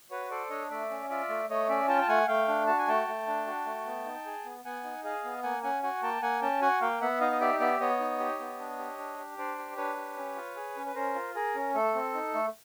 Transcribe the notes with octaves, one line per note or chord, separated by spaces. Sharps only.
F#4 B4 C#5
A4 C5 D5
D4 C#5 D#5
A3 D5 E5
C#4
F4 D5 E5
A3
A3 C#5 D#5
C#4 D5 E5
F4 G5 A5
A5
A3 F#5 G#5
A3 F5 G5
D4
F#4 A5
G#5
A3 G5 A5
A3
D4
F#4
A3
B3
D#4
G#4
B3
B3 F#5 G#5
D#4
G#4 D#5 F5
B3
A#3 F#5 G#5
C#4 F#5 G#5
F#4 F#5 G#5
A#3 G5 A5
A#3 F#5 G#5
C#4 G5 A5
F#4 F#5 G#5
A#3 F5 G5
B3 E5 F#5
D#4 D#5 F5
D#5
G4 D5 E5
B3 D5 E5
B3 C#5 D#5
D#4
G4
B3
D4
G4
D4
G4
D4 C5 D5
G4
D4 B4 C#5
G4
C#4
F4
G#4
C#4
B4
C#4 A#4 C5
F4
G#4 A#4
C#4
A3 A4
C4
D#4
A3